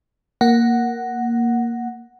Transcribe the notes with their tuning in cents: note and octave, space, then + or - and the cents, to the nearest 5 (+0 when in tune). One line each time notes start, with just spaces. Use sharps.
A#3 +0 F#5 +0